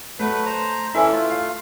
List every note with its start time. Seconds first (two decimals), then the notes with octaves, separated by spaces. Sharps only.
0.19 F#3 A3 B4
0.46 C5 A#5
0.94 E3 C#4 E4 A4
1.12 A3 F4
1.30 F5